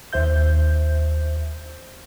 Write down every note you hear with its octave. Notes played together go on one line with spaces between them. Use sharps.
D#2 C5 E5 G6